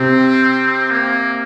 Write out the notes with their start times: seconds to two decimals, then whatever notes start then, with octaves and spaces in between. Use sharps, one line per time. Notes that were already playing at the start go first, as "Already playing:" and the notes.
Already playing: C3 C4
0.91 A#3